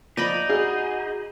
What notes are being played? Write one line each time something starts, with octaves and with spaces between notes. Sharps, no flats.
F3 D#4 D5 D#5 B5
F#4 G#4